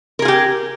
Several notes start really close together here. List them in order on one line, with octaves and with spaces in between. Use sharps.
A#4 G#4 F4 G4